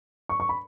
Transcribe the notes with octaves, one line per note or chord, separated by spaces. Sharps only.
C#6
C#6
B5